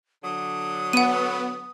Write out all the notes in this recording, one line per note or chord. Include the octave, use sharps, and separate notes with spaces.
D3 F#3 D#6
B3 F#5 D#7